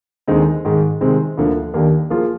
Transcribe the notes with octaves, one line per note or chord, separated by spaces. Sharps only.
D#2 D3 G#3 C4 D#4
G#2 D#3 G#3
C3 D#3 G#3 C4
D2 D3 F3 A#3
D#2 D#3 A#3 D4 G4
F3 A#3 F4 G#4